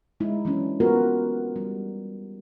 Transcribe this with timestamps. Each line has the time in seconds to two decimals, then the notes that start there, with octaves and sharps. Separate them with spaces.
0.20 G#3 D#4 E4
0.45 E3 F#3 C#4 D4
0.80 B3 F4 F#4 A#4 B4
1.56 G3